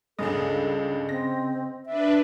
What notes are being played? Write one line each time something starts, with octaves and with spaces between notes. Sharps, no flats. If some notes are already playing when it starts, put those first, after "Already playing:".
C#2 G2 C#3 G#4 A4 D#5
C4 A#6
D4 B4 E5